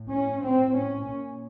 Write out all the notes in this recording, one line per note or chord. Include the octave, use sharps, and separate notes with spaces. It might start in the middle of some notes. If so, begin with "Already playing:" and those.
Already playing: A2
C#4
C4
C#4
A#2